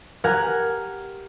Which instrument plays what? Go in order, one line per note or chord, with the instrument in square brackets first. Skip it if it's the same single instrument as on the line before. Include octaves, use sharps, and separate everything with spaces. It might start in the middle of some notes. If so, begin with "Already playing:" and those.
[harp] G4 A#4 F#5 G#5